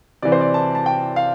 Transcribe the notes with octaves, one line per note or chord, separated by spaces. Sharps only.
C3 E3 D5
C5
D5
A5
A5
G5
F5